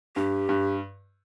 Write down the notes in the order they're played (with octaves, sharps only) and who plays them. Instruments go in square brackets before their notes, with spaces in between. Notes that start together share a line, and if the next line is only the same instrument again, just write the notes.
[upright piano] G2 [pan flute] G4
[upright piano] G2